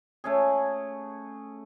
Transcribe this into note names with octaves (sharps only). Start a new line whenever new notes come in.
A3 C#4 G#4